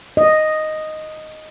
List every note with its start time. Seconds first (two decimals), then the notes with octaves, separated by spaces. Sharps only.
0.17 D#5